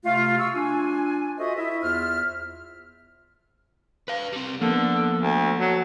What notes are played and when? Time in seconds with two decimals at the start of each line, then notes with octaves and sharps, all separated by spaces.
0.04 C3 A3 F4
0.39 C#6 E6
0.53 D4 F4 G#5
1.39 F4 F#4 A4 C5 D#5 E5
1.57 E4 D#5 E5
1.83 E2 F4 C5 E5 F6
4.08 B4 F5
4.33 G3 C4
4.62 D3 F3 A#3 B3
5.22 D2
5.60 F#3